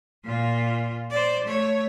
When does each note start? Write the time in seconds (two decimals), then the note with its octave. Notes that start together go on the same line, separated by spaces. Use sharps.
0.24 A#2 F4
1.10 C5 D5
1.44 A3 C#5